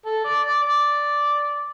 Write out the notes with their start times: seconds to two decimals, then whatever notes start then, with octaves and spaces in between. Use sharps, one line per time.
0.05 A4
0.24 D5
0.43 D5
0.62 D5